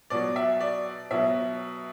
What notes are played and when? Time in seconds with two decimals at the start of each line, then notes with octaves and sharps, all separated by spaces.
0.10 B2 F#3 D5
0.36 E5
0.60 D5
1.11 B2 F#3 E5